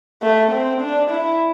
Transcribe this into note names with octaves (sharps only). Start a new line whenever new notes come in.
A3
C4
D4
E4